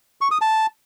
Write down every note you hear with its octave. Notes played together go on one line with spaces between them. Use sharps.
C#6
D#6
A5